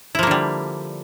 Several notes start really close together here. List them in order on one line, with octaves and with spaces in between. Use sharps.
E4 F3 A#3 D3 G3